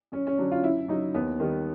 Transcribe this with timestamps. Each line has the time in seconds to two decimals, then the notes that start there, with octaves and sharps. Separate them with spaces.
0.12 F#2 C#4
0.27 C#4
0.38 D3 F#3 D4
0.51 F4
0.63 F#2 E4
0.88 C#3 F#3 D#4
1.14 D#2 B3
1.40 D#3 G3